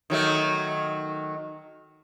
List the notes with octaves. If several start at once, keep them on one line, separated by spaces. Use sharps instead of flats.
D#3 F#3 A3